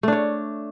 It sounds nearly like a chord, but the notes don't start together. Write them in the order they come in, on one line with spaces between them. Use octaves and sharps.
A3 D4 C#5